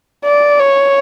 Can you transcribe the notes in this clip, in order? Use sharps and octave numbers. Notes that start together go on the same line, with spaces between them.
D5
C#5